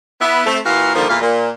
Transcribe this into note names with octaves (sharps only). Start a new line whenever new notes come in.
B3 E4
A3 C4
A#2 E3 F#4 A#4 F5
D3 D#3 F3 G3 A#3
E2 A#2 E3 F4 B4 F5
A#2